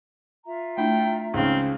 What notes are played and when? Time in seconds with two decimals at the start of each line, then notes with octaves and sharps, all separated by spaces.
0.45 F4 E5 A#5
0.78 A3 D4 E4 G5
1.34 C#2 C#3 C4 D#4